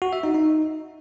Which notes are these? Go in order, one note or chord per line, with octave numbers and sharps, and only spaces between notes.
F#4
E5
D#4
D#4